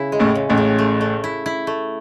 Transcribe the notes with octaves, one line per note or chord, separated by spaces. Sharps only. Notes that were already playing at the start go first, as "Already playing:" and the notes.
Already playing: C#3 B3 E4
G#3
A1 A2
C#3
A1 A2
C#3
A3
A3
E4
E4
A3